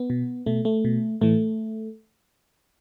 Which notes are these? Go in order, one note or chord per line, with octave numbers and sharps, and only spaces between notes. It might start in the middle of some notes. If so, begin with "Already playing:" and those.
Already playing: B3
B2
B2 A3
A3
B2
A2 E3 A3